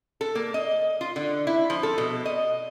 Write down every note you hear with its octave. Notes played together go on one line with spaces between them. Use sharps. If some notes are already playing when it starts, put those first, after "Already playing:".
A4
A#3
D#5
F4
D3
E4
F3
A4
B2
D#5